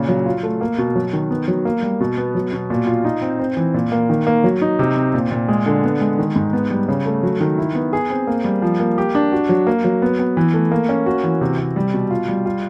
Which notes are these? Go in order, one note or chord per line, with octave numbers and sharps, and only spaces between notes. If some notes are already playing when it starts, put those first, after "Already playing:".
Already playing: A#2 C#3
F#3
F4
A3
A#3
B2
F#3
D#3
B3
F#3
A#3
G3
B2
B3
F#3
B2
A#2
F4
D#4
C4
C4
E3
A#2
A#3
D#3
A#3
F#3
D#4
C3
C4
A#2
A#2
G#3
D3
B3
G#3
D#3
G#2
B3
G3
C#3
A3
F#3
D#3
E4
B3
G#4
C4
A#3
G3
F3
A#3
G4
D4
F#4
F#3
A#3
F#3
B3
B3
E3
A3
A#3
C#4
F#4
E3
C3
C3
G3
B2
F4
G3
F4